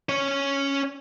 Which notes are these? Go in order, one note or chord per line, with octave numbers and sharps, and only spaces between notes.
C#4 C#5